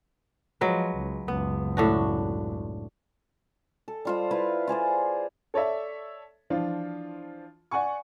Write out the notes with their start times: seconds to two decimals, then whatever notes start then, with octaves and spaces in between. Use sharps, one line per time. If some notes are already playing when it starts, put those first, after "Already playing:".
0.61 F3 F#3 G#3 B4
0.96 C#2
1.28 F#1 C#2 B3
1.77 A2 D4 F#4
3.88 A4
4.05 G3 F4 C5
4.31 E4 F4 B4
4.68 F4 G#4 C5 D5
5.54 A4 C#5 D5 E5
6.50 E3 F3 D4 F4
7.71 D5 F#5 G#5 C#6